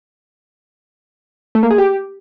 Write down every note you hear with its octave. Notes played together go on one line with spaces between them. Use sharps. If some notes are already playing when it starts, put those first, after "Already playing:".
A3
A#3
G#4
G4